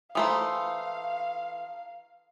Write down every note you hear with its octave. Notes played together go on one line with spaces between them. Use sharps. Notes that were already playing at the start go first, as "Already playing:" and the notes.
E3 A3 C5 F5 A#5 C6 D#6